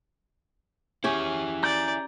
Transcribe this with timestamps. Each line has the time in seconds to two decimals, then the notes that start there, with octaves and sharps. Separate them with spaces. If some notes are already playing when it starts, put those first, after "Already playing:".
1.04 C#4 E4 G4 G#4 G5
1.63 D5 A#5 G6